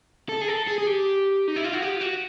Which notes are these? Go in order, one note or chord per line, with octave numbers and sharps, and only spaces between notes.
A4
G#4
A4
G#4
G#4
G4
D#4
E4
F4
F#4
G4
F4
F#4